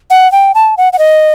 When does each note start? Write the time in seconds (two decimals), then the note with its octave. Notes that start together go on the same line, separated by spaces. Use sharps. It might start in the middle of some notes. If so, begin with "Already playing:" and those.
0.10 F#5
0.32 G5
0.55 A5
0.77 F#5
0.93 F#5
0.99 D#5